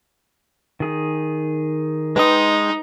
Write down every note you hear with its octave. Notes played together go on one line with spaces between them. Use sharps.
D#3 G#4
G#3 D#4 B4 G5 C6 D#6